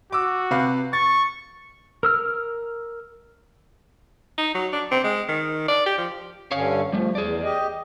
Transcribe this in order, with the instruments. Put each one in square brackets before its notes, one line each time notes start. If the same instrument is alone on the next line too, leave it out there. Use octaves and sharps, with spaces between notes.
[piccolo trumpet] F#4 [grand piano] D6 E6
[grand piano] C3 B4 F5
[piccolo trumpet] C#6 [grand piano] A6
[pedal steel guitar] A#4 E6 F6
[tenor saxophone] D#4
F#3
D4
C4
G#3
D#3
D5
G4
F3
[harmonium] G2 D3 C#4 [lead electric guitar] C#5 F5
[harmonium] F3 [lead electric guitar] G3 A3
[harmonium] E2 [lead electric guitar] G#4 D5
[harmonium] G4 D#5